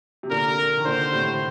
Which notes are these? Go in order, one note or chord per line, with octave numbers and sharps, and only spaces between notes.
C3
A#2 D3 A#4
D#3
A#2 D3 C5
A2 C3